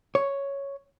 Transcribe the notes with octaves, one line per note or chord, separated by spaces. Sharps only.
C#5